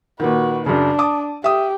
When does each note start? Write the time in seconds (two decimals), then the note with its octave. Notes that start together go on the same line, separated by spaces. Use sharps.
0.20 A#2 D#3 F#4 B4
0.66 F#2 C#3 D4
0.99 A5 D6 D#6
1.44 G4 E5 D#6